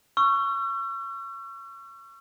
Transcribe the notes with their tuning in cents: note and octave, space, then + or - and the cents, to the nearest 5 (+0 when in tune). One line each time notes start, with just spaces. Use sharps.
C#6 +0 E6 +45